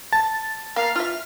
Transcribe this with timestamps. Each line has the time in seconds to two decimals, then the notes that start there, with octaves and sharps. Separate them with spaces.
0.12 A5 A6
0.76 A#3 F5
0.96 F4 E5 F6